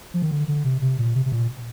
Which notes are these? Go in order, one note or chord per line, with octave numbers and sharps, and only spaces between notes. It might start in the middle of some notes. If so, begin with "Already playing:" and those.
F3
D#3
D3
D3
C3
C3
A#2
C3
C3
A#2